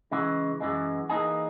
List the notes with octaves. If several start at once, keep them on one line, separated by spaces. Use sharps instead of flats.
C#3 E3 G#3
F#2 E3 G#3
E3 A#3 D#4 G#4